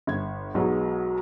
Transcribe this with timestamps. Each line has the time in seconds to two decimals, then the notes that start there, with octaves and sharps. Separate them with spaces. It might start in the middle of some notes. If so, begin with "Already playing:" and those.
0.07 G1 G#6
0.54 B1 F#3 G#3 B3 D#4